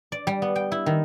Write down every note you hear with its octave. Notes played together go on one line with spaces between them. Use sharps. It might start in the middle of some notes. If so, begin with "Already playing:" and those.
D5
G3
B3
G5
E4
D#3